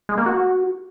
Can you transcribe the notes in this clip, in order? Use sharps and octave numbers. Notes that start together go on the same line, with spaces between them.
G#3
A#3
F#4